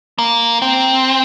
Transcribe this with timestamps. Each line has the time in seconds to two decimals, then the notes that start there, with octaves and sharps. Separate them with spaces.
0.18 A#3
0.62 C4